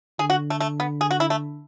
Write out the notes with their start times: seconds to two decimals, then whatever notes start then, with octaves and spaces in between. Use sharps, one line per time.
0.19 D3 G#4
0.30 F#4
0.50 A3
0.60 A3
0.80 B3
1.01 G#4
1.11 F#4
1.20 E4
1.30 A3